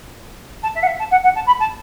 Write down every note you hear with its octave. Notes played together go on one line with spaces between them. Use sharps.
A5
E5
F#5
E5
A5
F#5
F#5
A5
B5
A5